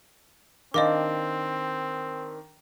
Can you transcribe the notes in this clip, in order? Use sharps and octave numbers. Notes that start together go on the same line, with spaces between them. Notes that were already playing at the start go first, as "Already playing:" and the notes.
D#3 C4 D4 D#5 F5 D6